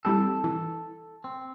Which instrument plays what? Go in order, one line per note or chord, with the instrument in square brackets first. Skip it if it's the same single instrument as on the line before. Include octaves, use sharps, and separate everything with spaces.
[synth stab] E3 G3 C4 [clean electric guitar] A4
[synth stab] E3
[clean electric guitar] C4